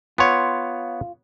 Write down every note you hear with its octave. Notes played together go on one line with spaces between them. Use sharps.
B3 F4 C#5